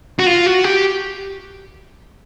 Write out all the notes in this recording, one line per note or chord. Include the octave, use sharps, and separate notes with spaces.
F#4
F4
F#4
G4